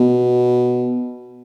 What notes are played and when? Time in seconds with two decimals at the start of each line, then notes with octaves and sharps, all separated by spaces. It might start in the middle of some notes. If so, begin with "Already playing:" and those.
Already playing: B2